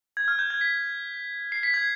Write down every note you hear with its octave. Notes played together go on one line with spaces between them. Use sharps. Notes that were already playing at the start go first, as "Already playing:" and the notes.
G#6
F6
G6
G#6
B6
C7
B6
G#6